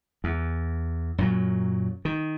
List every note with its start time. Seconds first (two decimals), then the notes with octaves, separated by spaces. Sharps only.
0.24 E2
1.18 F#2 A#2 F#3
2.05 D#3